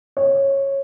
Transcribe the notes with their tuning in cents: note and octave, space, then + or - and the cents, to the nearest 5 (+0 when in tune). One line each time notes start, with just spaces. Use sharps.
C#5 -15